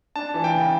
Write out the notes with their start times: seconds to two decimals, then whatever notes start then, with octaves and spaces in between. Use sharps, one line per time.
0.16 D4 A5
0.34 E3
0.44 G5
0.54 C#3